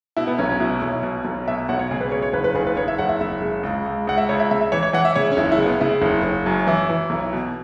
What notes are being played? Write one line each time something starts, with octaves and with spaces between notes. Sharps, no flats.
B2 E4
B3
B1 C#4
C#4
B2 E4
B1
B2
B1
B2 E5
B1 F#5
C#5
C#3 G#4
B4
C#3 C#5
C#5
F#1 B4
B4
F#1 G#4
B4
F#1 C#5
E5
F#1 F#5
E5
F#1 E5
C#3
C#2
C#2
C#2 F#5
E5
C#2 C#5
E5
C#3 E5
E5
E3 C#5
C#5
E3 F#5
E5
C#3 C#5
C#4
F#1 E4
E4
C#3
B3
C#3 E4
F#1
F#1
F#2
E3 E4
E3
B1
B2